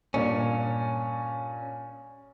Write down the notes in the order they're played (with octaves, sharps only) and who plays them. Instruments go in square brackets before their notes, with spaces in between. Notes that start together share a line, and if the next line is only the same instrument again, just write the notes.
[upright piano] G2 A#2 D4 [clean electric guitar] C#4